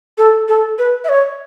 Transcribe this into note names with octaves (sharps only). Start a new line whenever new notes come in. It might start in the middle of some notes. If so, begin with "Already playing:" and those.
A4
A4
B4
E5
C#5